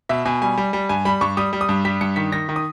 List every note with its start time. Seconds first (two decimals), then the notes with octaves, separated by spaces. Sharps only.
0.09 B2 E5
0.25 B2 G#5
0.42 G3 G#5
0.58 G3
0.73 G3
0.89 G2 G#5
1.05 G3 B5
1.21 G2 C#6
1.37 G3 D#6
1.53 G3
1.61 D#6
1.69 G2
1.85 G3 B6
2.01 G2 C#7
2.16 D#3 B6
2.32 D#3 A#6
2.49 D#3
2.56 D#6